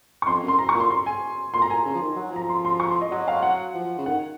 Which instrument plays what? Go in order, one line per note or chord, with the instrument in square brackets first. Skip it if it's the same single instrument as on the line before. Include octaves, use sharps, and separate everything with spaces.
[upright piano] C#6
[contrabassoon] F2 [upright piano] C6
[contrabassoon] F#2 [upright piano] C6
[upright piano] A#5
C#6
[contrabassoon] A#2
[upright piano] C6
C6
G#5
[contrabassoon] A#2 [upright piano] C6
[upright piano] A#5
[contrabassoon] A#2 [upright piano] G#5
[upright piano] A#5
[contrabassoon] C#3
F3
D#3
F#3
[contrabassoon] F3 [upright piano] A#5
[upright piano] C6
C6
C#6
C6
D#5
[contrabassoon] F#3 [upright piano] D#5
[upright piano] F5
F#5
[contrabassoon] F3
C#3
[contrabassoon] D#3 [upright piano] F#5